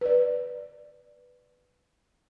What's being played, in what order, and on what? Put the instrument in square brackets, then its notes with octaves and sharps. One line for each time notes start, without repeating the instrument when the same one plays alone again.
[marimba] B4 D5